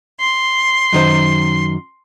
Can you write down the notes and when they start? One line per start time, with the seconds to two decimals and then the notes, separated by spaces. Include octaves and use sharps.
0.19 C6
0.93 F#2 D#3 C5